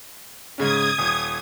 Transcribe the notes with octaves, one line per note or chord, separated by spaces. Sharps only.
G#2 C#3 C#4 D#6 G#6
D#1